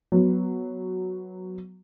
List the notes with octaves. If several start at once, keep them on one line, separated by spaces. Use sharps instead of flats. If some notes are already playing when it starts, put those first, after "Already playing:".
F#3 B3